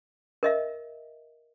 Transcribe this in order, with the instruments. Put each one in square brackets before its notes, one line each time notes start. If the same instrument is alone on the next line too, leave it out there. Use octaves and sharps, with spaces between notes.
[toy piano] A#4 D#5 E5